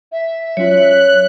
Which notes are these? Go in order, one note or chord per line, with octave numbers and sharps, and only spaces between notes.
E5
F#3 C#4 F4 C#5 F#6